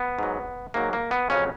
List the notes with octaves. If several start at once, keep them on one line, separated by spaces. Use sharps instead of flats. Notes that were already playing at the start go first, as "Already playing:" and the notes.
Already playing: B3
G#2 F#3
G#2 F#3 A#3
A#3
B3
F2 C#3 F#3 C#4